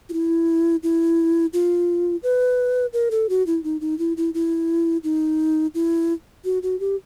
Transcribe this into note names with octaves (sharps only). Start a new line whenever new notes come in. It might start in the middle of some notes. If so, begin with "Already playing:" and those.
F4
E4
E4
F4
B4
A#4
A4
F#4
E4
D#4
D#4
E4
E4
E4
D#4
E4
F#4
F#4
G4